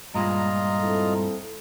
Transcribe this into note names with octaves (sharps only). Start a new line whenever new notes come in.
G2 A#2 G#3 F4 D#5 A#5
C4 E4 A4